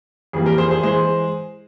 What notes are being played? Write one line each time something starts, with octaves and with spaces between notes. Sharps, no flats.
F2 E3 G3 A#3 G#4
G4 A#4
G#4 C5
G#4 C5
E3 G#3 G#4 C5